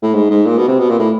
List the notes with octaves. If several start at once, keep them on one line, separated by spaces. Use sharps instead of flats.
A2
G#2
G#2
A#2
B2
C3
B2
A#2
A2